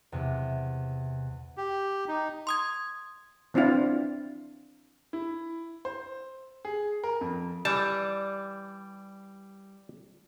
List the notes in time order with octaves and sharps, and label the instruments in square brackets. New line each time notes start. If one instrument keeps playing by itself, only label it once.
[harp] E2 C3
[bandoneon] G4
D#4
[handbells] C6 D#6 G#6
[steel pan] E3 C4 D4 E4 F4
[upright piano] E4
C5
G#4
A#4
F2
[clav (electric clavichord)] E3 A5 [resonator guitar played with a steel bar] G3